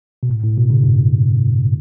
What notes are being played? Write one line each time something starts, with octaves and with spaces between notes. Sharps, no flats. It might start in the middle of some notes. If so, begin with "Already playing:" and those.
B2
A2
A2
B2
C#3
G2